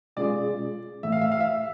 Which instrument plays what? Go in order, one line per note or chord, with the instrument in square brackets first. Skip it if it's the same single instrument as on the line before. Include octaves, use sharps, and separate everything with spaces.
[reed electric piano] B2 G#3 C#4 F4 G#4 [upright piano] D5
[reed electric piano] A2 E3 A3 [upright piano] E5
[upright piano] F5
E5
F5
E5